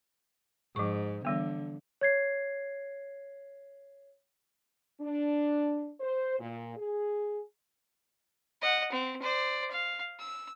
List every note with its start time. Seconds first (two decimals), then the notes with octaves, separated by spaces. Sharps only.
0.76 G#2 F3 C#6
1.25 D3 E3 G3 B3
2.01 C#5 G#6 C7
5.01 D4
6.01 C5
6.39 A#2
6.76 G#4
8.62 D#5 F#5
8.92 C4
9.22 C5 D5
9.71 F5
10.19 E6